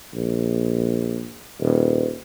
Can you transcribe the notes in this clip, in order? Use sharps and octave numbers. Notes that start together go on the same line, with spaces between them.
A#1
D#1